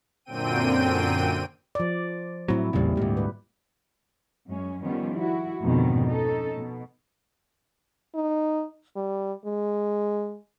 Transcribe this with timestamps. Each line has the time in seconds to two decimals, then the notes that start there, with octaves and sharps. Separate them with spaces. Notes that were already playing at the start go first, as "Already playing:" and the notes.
0.25 F#2 A#2 D3 C4 G5 D#7
1.75 F3 D5
2.48 A2 F#3 C4 E4
2.73 A1 E2 A#2 C#3 G3
2.97 D2 G#2 G4
3.17 B4
4.47 F#2 G#3 C#4
4.82 D#3 F3 G3 B3 C#4
5.15 E4 F#4
5.61 F2 G#2 B2 D3 D#3 G3
6.06 C#4 D#4 A4
6.56 B2
8.15 D#4
8.96 G3
9.45 G#3